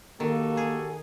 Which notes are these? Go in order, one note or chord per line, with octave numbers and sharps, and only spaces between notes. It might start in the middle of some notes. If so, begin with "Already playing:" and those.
D#3 A#3 F#4 G4 A4
G#4